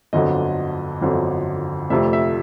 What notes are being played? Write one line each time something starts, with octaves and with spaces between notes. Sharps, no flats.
G1 F2 D3 F#3 D#5
G1 F2 D3 F#3
F1 F2 C3 F3 A3 E5
E5